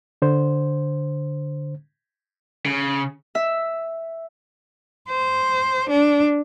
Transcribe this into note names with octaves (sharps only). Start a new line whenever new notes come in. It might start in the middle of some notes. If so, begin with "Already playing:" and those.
D3 C5
C#3
E5
C5
D4